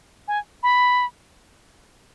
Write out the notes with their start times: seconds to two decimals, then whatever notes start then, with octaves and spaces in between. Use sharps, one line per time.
0.28 G#5
0.63 B5